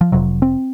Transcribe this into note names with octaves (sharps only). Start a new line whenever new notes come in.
F3
F1 F2 C3 F#3
C4